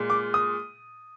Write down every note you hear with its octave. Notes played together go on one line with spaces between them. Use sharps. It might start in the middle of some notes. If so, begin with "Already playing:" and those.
Already playing: A#2 G#3
D6
D#6